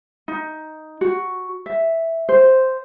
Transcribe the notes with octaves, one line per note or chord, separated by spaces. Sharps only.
D#4
F#4
E5
C5